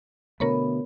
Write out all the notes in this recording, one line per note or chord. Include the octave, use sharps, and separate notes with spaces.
B2 D3 A3 B3 A#4 C#5 B5